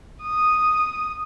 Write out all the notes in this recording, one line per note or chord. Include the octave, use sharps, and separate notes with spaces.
D#6